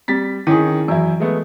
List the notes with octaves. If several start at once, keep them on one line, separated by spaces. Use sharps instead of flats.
G3 C4 A6 B6
D#3 C#4 E4 G#4
F#2 E3 E4
G#3 A3 B3